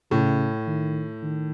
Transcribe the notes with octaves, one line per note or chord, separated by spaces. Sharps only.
A2 C#3
D#3
D#3